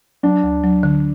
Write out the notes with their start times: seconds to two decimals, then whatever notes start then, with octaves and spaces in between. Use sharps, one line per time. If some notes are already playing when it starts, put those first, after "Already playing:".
0.23 F#3 D4
0.43 D2
0.64 F#3
0.83 D3